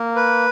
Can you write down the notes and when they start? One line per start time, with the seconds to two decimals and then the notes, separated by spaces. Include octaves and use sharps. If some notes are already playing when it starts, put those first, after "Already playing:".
Already playing: A#3
0.16 B4